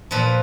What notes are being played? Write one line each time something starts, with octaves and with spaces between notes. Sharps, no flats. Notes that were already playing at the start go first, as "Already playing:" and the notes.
A#2 F3 B4